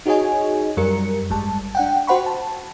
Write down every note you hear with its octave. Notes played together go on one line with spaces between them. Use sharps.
D#4 F#4 G#4 C#5 D#5 G#5
F#2 G3 A#4 C#7
G#1 G3 G#3 A5
D4 F#5 G5
F#4 C5 F#5 B5 C#6
A5